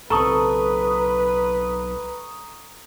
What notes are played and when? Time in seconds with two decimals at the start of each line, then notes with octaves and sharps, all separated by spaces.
0.10 B1 C4 A4 B4 A#5 C#6 D#6